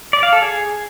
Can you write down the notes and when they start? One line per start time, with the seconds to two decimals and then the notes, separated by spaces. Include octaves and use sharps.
0.13 D5
0.23 F5
0.33 A4
0.42 G#4